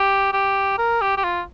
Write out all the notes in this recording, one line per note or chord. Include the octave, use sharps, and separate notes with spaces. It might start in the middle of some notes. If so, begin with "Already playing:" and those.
Already playing: G4
G4
A#4
G4
G4
F4